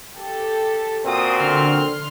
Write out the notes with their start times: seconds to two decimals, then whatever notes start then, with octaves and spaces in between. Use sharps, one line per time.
0.18 G4 A4
1.06 A#2 C4 F#4 D#6
1.40 D3 C6 F6